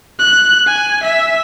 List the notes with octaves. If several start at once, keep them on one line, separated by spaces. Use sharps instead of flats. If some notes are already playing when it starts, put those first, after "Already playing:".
F#6
G#5
E5